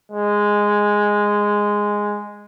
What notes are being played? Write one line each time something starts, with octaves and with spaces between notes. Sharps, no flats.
G#3